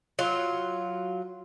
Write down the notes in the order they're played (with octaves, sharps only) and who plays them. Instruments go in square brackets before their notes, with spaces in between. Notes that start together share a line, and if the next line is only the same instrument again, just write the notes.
[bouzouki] F#3 F4